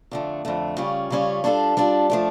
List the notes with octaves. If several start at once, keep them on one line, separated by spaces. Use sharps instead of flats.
F2 D3 A3
F2 D3 A3
C#3 G3 C#4 F4 C#5
C#3 G3 C#4 F4 C#5
G3 D4 F4 A4
G3 D4 F4 A4
F3 A3 D4